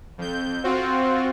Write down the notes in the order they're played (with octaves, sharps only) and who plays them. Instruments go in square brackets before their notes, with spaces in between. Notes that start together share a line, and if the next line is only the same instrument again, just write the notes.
[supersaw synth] F2 G6
[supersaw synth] C4 F4 F#4 [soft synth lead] C5